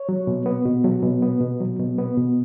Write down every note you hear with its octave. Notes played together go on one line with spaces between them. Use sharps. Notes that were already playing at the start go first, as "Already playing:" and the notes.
Already playing: C#5
F#3
B2
B3
B2
F#3
B2
B3
B2
F#3
B2
B3
B2